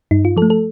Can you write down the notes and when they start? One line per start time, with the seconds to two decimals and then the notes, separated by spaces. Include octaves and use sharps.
0.11 G2 D#4
0.25 F4
0.37 F3 A4
0.42 A3
0.50 A4